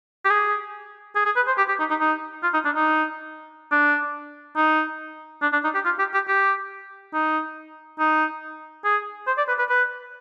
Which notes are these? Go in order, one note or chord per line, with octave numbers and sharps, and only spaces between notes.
G4
G#4
G#4
G#4
B4
C5
G4
G4
D#4
D#4
D#4
F4
D#4
D4
D#4
D4
D#4
D4
D4
D#4
G4
F4
G4
G4
G4
D#4
D#4
G#4
C5
D5
B4
B4
B4